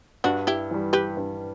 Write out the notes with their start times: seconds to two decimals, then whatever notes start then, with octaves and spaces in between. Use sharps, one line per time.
0.24 G2 D4 F#4
0.47 E4 G4
0.71 E3 G3
0.93 G4 B4
1.17 G2